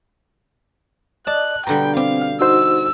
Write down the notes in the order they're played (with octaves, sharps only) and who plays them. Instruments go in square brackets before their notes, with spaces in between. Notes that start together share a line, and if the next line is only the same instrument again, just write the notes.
[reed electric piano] D5 D#5 [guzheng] A5 [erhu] F#6
[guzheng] B2 D3 G3 [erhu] G5 [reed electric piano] A#5
[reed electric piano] C4 [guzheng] G4 [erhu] F5
[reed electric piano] D#4 F#4 C5 [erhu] E6